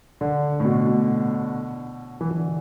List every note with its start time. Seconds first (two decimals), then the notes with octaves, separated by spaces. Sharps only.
0.21 D3
0.60 A2
0.65 B2
0.87 B2
2.21 E3
2.31 E3
2.37 D3